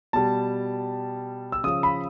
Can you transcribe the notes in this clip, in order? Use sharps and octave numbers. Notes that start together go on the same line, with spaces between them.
B2 G3 A5
E6
C#3 F3 D#6
B5